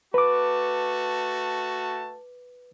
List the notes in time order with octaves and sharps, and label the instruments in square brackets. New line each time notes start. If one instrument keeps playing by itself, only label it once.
[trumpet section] A3 F#4 A5 [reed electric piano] B4 D6